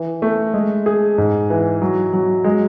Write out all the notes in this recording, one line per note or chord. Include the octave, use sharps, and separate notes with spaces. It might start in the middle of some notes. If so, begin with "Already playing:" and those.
Already playing: E3
A3
G#3
G#4
G#2
E3
F#3
F#3
G#3